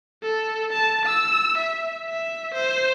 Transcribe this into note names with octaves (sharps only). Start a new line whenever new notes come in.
A4
A5
E6
E5
E5
C5